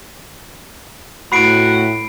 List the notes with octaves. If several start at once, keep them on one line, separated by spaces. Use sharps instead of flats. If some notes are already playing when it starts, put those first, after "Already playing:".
A2 F#3 B3 F#4 B5 C7 D7